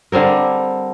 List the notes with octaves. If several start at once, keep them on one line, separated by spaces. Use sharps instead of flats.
D3 G3 C4 A#4